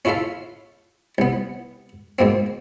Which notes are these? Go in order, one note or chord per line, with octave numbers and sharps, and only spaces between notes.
C#4 E4 F4 A4 E5 F5
C2 B3
G#2 B2 A#3 C4